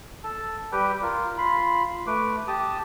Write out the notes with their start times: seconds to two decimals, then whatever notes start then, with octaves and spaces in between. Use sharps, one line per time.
0.24 A4 A5
0.72 G3 G4 B4 G5
1.02 F4 A#4
1.38 F4 B5 C6
2.07 A3 B4 D6
2.48 G4 A5 D#6